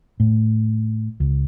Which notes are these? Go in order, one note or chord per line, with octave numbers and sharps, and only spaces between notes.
A2
C#2